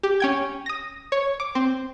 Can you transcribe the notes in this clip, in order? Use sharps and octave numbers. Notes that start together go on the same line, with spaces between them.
G4
C#4 G5 G#6
D#6 A#6
C#5
D6
C4